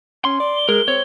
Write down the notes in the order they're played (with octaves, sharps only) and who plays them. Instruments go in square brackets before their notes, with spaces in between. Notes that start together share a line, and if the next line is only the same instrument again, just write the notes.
[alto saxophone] C#4 [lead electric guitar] C6
[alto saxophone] D5
[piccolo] G7
[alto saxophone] G#3 [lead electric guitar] A#4
[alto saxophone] C4 [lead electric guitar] C#5